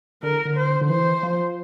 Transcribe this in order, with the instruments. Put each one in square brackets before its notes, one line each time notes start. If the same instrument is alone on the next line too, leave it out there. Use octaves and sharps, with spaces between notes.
[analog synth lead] D3 [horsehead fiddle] A#4
[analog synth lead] D3
[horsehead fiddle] C5
[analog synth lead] D3
[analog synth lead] E3 [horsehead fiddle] C5
[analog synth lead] F3